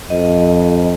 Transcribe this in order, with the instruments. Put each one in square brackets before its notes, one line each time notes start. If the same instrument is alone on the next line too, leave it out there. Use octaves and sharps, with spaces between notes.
[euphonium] F2 [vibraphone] D#5